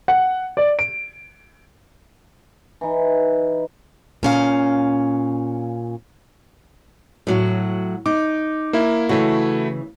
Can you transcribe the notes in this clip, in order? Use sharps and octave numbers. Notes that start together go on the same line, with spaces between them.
F#5
D5
D7
E3 D#4
A#2 C#4 F5
A2 F#3 F#4
D#4 D6
A#3 E4
C#3 E3 A3 E4 F#4